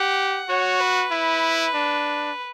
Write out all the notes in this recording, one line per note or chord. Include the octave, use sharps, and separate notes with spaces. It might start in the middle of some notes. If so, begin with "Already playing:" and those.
Already playing: G4 F#5
F#4 C#5
B4
E4
D4